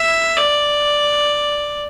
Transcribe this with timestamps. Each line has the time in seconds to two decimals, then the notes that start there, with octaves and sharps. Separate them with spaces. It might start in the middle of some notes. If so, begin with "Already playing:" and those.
Already playing: E5
0.38 D5